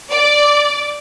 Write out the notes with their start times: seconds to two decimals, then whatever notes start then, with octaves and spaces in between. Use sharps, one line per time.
0.10 D5